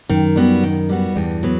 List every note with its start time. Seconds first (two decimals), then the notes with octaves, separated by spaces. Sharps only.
0.09 F#2 D#3
0.36 G3 B3 F#4
0.63 D#3
0.89 G3 B3 F#4
1.16 E2 G2
1.43 F#3 B3